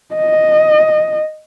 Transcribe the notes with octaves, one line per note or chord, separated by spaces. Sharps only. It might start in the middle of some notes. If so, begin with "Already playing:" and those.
D#5